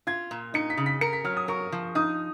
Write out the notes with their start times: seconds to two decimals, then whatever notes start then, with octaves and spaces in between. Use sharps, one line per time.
0.07 F4 G#6
0.31 A#2
0.54 D#4 C#7
0.70 B6
0.77 C#3
0.86 B6
1.01 A#4 C#7
1.13 B6
1.25 F#3 F6
1.37 D#6
1.48 A#4 C#6
1.72 F3
1.95 D#4 D#6